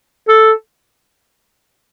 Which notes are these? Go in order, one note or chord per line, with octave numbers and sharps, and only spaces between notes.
A4